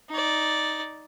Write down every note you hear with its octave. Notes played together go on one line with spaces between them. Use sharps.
D#4 D5